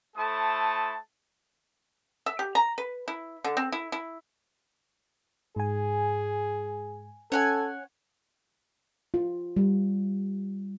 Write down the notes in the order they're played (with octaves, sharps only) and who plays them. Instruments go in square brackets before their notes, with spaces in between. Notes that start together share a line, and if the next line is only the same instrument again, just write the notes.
[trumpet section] A3 E4 A4 C5 A5 D#6
[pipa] E5
G4
A#5
B4
E4
D3
C4
E4
E4
[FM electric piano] G#2 G#5 [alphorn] G#4
[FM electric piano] C#4 [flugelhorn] A4 [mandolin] C#5 F#5 G#5
[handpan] F4
G3